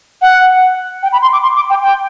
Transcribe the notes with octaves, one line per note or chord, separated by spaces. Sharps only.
F#5
G5
B5
C6
D6
C6
D6
G5
G5